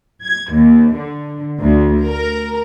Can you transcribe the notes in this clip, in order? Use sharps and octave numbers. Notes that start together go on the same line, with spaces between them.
G#6
D#2
D3
D2
A#4